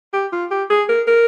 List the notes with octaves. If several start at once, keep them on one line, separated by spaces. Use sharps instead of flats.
G4
F4
G4
G#4
A#4
A#4